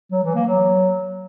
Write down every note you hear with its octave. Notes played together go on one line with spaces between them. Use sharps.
F#3
E3
A#3
F#3